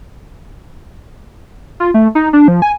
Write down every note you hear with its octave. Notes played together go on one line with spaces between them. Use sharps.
F4
A3
D#4
D4
F3
G#5